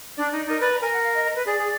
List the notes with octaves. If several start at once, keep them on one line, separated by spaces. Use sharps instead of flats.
D4 D5
D#4
D#4 A#4
B4 D5
A#5
A#4 G#5
F#5
F5
D#5
D#5
B4
G#4 D5
G#4